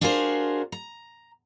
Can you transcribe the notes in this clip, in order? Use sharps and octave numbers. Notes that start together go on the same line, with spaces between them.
D4 F4 F#4 G#4 A#4 C5
A#5